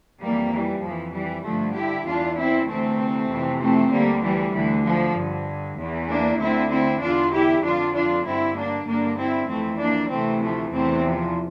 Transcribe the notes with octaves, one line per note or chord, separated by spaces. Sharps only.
F2 E3 G3 A#3
E3 G3
F2 E3 F3
E3 G3
G2 D3 F3 A3
E4 G4
E2 E3 D4 F4
C4 E4
D2 C3 E3 A3 C4
F2 C3 E3
A3 C4
D2 D3 G3 A#3
E3 G3
D2 D3 E3
F3
G2 D3
E2 E3
A#3 D4
D2 D3 C4 E4
C4 E4
E2 D3 D4 F4
E4 G4
F2 D3 D4 F4
D4 F4
G2 D3 C4 E4
A#3 D4
G2 D3 A#3 D4
C4 E4
F2 E3 A3 C4
A#3 D4
D2 C3 E3 A3 C4
F3 A3
E2 C3 E3 A3 C4
F3